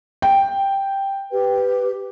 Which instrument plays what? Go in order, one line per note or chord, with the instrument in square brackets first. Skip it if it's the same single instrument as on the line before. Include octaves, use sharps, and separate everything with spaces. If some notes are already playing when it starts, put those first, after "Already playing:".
[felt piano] G5
[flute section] G4 B4